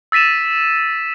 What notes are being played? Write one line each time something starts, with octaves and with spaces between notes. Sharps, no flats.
E6 A6 B6 D#7 E7